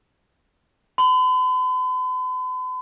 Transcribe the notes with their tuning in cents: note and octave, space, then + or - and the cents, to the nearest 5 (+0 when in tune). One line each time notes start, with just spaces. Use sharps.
B5 +45